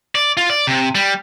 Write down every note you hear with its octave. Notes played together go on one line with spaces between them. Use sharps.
D5
F4
D5
C3
G3